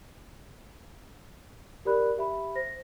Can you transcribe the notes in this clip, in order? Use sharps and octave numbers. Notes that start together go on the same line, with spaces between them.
G4 A#4 D5 B5 F#6
G4 E5 B5
C5 A#6